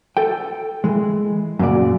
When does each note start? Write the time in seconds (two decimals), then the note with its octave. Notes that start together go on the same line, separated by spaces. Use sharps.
0.17 A4 G5
0.84 E3 G#3
1.59 F#2 A#2 C#3 D5